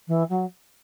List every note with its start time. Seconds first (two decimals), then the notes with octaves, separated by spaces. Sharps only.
0.07 E3
0.29 F#3